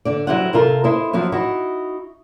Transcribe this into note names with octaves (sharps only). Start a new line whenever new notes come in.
D3 D5
F#3 G3 E4 C5 F#5
C3 F4 A4 A#4
E4 C5 D#5
F3 F#3 C4 E4
D#4 E4 F#4